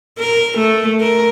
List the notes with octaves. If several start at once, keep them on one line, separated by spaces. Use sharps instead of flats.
A#4
A3
A#4